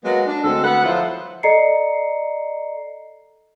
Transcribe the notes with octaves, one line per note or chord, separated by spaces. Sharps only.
F#3 G#3 A#3 B3
D4
D2 G#3 C4 A4
D2 B3 B4 F#5
F3 F#3 E4 F4 A4 C5
A4 D5 D#5 A#5 C7 C#7